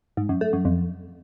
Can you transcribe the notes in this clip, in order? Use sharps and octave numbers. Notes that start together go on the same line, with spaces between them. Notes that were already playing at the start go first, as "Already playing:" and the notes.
G#2
F#2
A3
F#2
F2